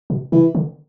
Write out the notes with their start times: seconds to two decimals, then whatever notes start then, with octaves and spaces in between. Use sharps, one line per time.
0.10 B2
0.32 C3 E3
0.55 D3